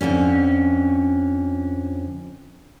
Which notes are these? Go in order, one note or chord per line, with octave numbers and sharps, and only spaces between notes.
F2 G#2 D3 C#4